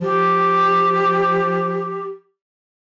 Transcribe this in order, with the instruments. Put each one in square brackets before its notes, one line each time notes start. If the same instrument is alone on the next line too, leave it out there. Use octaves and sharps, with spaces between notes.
[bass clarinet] F3 [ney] G4